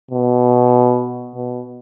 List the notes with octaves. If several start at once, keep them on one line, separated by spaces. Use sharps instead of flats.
B2
B2